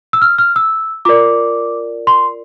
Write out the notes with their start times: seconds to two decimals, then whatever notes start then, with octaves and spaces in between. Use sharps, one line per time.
0.13 E6
0.22 F6
0.39 F6
0.56 E6
1.05 F4 A#4 D5 D6
2.07 C6